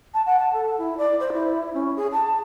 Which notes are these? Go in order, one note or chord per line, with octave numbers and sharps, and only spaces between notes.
A5
F#5
A5
A4
E4
D5
C5
E4
C#4
G#4
A5